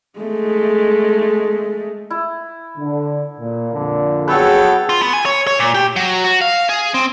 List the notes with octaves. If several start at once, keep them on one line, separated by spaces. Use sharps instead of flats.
G#3 A3
E4
D3
A#2
F2 A#2 D3
F#3 B3 G#4 A4 B4 C#5 F#5 G5
F4
B3
G#5
C#5
C#5
A#2
G4
F#3
F#4
F5
G#4
C4